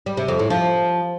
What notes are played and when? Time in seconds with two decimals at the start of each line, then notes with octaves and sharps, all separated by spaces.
0.06 G3
0.17 C3
0.28 F2
0.39 A2
0.50 F3